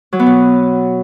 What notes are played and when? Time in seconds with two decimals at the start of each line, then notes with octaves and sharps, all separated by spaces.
0.13 F#3
0.20 B3
0.26 B2